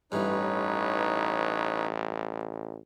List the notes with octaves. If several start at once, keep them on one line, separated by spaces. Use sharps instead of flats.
A1 G2 E3 D#4 B4 C#5